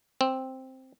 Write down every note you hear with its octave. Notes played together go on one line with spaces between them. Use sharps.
C4